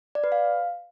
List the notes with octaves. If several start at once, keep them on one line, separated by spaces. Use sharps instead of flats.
D5
B4
F5